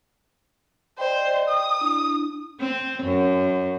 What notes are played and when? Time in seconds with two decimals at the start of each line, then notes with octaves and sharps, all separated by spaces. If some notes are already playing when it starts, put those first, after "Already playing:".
0.99 C5 D5 D#5 G5
1.49 D#6
1.81 D4 E4
2.60 C4
3.03 F#2